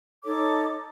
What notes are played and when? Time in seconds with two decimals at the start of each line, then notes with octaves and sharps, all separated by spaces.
0.24 D#4 A4 C#5 D6